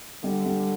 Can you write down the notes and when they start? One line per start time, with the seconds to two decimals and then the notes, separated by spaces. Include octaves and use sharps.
0.24 D3 G3
0.46 G3